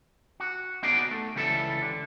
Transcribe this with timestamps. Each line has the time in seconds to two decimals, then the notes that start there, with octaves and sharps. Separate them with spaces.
0.40 F#4
0.83 B3 D#4 F#4 G#4 A#4 D5
1.11 A3
1.35 C#2 E3 G3 A4 E5
1.82 D3